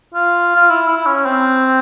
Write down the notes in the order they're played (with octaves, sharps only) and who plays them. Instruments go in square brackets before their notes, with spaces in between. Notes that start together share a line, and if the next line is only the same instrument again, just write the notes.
[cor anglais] F4
F4
E4
E4
C#4
C4